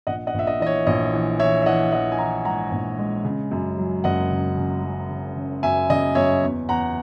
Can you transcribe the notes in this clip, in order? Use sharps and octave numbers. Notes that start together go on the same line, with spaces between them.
A#1 D#5 F#5
D#5 F#5
A#1 E5
D#5
E3 D#5
C#5
A#1 D#5
E3
E3 C#5 E5
E5
E3 D#5 F#5
E3 D#5 F#5
G#5
E3 F#5 A#5
G#2 F#5 A#5
A#1
G#3
C#3
F#2
F#3
F#1 D#5 F#5
C#3
C#3
F#3
C#3
C#3
F#2 E5 G#5
C#3 D#5
F#2 C#5 E5
E2
E2 F#5 A#5